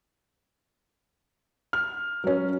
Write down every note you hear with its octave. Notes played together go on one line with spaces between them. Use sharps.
F6
F#3 C#4